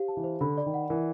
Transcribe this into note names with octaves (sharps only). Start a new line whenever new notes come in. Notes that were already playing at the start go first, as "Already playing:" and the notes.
Already playing: G4 C5 F5
A5
E3
C5
D3 B5
D5
D#3
F#5
E3 A#4